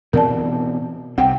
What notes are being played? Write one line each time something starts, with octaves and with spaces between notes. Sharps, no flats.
B2 E3 C4 A#4 D5 A5
C2 C3 C4 F#5 G5